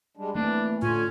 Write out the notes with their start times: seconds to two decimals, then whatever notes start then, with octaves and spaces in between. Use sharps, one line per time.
0.17 G3 G#3 D4
0.35 E3 A3 A#3 C4 D4
0.82 A2 D3 C#4 F4 G#5